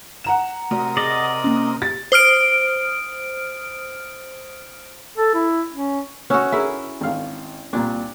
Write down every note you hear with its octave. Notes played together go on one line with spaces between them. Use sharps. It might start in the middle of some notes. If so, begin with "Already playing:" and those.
F#5 A#5 E7
C3 A3 F#4 A#4 D5 D#6
G#4 D5 D#5
A#3 C#4
G4 A6
C5 D#6 F6 D7
A4
E4
C#4
C#4 F#4 E6 F#6
E4 G#4 A#4 E5
G#1 F5
C2 A#2 D4